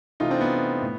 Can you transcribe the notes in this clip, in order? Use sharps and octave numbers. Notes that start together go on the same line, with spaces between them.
C3 E3 A3 D#4 F4
C4 D4
B3
A2